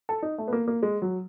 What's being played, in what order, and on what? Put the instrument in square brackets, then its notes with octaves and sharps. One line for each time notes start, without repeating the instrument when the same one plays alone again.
[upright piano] A4
D#4
A3
B3
A#3
A#3
G#3
F#3